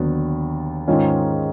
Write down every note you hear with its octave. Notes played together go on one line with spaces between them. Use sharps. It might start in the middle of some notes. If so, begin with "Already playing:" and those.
Already playing: D#2 D3 F#3 B3
G#2 D#3 G#3 C#4 F4